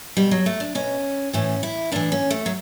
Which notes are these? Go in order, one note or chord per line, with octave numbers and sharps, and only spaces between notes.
B2 G3
F#3
A3
D4
B2 C#4
A2 E3 C#4
E4
A2 E3 D4
C#4
A3
F#3